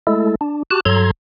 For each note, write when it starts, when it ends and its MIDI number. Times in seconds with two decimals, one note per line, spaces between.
0.07 0.35 56
0.07 0.35 57
0.07 0.35 64
0.07 0.35 69
0.41 0.63 62
0.71 0.80 66
0.71 0.80 67
0.71 0.80 81
0.71 0.80 90
0.85 1.11 43
0.85 1.11 54
0.85 1.11 69
0.85 1.11 82
0.85 1.11 84
0.85 1.11 92